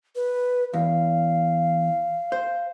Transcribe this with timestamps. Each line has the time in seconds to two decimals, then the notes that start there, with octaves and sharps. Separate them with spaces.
0.16 B4
0.73 E2 F5
2.32 C5